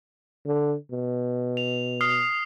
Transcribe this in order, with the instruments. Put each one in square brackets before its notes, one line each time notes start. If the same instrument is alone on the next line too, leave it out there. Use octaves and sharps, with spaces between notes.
[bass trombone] D3
B2
[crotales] F7
D#6 F6 C7